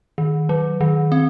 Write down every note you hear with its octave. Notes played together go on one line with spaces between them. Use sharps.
D#3
F#3
D#3
C4